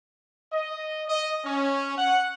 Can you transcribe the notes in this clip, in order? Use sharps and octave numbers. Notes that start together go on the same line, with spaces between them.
D#5
D#5
C#4
F#5